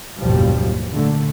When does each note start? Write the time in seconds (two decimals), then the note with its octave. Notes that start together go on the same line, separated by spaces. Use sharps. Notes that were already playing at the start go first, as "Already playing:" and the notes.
0.18 F#1 D#2 G#2 B2 F3 G3
0.93 A#2 D3 A3